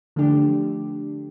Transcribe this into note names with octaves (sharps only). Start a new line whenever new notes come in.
D3 F3 A3 D4 G4